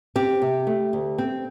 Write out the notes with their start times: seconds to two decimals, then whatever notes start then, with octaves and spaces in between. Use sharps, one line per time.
0.16 C4 G4
0.42 C3
0.67 A3
0.93 D2
1.18 C4